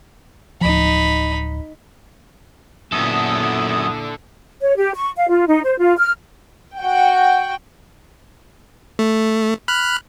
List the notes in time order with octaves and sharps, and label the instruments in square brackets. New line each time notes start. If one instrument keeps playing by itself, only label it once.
[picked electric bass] D1 F3 [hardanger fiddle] D#4 B5
[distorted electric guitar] F#2 B3 [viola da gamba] A#2 E4 [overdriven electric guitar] D3 A4 [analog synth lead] D#6
[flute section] C#5
G4
C#6
F5
F4
D#4
C5
F4
F6
[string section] F#4 G5 [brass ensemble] F#5
[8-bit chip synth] A3
B5 F6 F#6